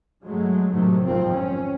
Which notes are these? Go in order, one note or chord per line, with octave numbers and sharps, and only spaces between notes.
G2 F#3 G#3 A3
A2 C3 D#3 F#3 A3
G#1 F2 D#3 F3 C4
C#4